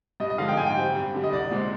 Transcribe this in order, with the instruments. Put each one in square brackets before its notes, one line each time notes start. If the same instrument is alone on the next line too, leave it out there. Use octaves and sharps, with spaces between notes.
[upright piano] G2 D#5
D#5
D3 F3 G#3 F5
G5
G#2 G#5
G5
G3 C4
G2
D3 G3
D#5
C2 D5
A#2 G#3 C4